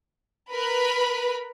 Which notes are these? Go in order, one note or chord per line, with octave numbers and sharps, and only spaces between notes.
A#4 B4 B5